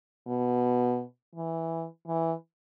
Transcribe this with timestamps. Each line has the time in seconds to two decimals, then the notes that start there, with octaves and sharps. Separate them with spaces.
0.27 B2
1.35 E3
2.07 E3